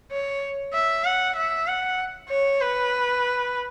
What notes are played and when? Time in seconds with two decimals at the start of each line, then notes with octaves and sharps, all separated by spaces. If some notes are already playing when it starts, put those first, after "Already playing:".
0.11 C#5
0.73 E5
1.05 F#5
1.36 E5
1.67 F#5
2.29 C#5
2.61 B4